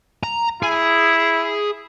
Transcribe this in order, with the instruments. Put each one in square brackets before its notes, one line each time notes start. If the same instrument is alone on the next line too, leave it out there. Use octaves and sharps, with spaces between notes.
[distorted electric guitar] A#5
[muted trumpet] E4 [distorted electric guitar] G#4